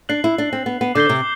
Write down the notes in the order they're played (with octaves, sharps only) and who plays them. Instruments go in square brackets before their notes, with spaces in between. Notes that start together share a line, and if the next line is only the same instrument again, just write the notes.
[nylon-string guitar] D4 [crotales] F#6 C7 F#7
[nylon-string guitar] E4
D4
C4
B3
B3
[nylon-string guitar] D3 [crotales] D6 G6 C7 G7
[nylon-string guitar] C3